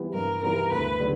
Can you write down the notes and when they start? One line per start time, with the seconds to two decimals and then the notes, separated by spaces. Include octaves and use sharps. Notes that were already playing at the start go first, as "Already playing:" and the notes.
Already playing: E3 G3 B3
0.13 G2 A#4
0.43 E3 G3 B3 A#4
0.71 D2 B4
0.99 D3 G3 B3